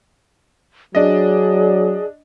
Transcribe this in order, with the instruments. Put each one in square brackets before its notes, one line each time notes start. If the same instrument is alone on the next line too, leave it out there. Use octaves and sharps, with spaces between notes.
[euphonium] F#3 [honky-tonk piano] D4 D#5 [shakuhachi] G#4